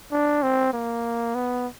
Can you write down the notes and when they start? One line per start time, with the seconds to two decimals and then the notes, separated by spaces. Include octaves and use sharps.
0.12 D4
0.43 C4
0.73 A#3
1.35 B3